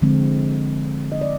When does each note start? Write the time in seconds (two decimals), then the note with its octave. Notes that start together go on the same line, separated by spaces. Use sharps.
0.02 D3 F3 G#3 C4
1.12 D#5
1.21 D5